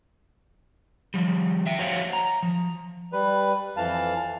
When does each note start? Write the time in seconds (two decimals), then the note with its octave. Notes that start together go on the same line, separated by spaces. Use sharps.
1.14 F3 G3
1.66 E5 G5
1.79 F#4 C5 C#5 F5 F#5
2.13 A#5
2.43 F3
3.13 G3 B4
3.77 F2 E3 F5 A5